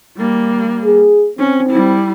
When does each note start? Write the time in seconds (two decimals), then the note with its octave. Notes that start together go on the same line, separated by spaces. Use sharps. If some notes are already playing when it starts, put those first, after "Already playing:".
0.17 G3 A#3
0.84 G#4
1.38 C4 C#4
1.70 G3 E4